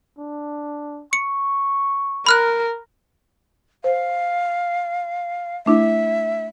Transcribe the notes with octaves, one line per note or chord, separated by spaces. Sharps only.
D4
C#6 C#7
A#4 B5 F6 F#6
C5 F5
A3 D4 E4 E5